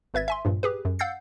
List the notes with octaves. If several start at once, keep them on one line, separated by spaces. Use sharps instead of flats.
G#1 B4 E5 G#6 A6
E5 G#5 C6
A#1 G2 A#2
G4 G#4 B4
F#2
F5 F#5 E6 G6 A6 C7